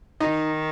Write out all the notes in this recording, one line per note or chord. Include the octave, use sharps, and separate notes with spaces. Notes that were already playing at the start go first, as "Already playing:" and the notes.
D#3 D#4 D#5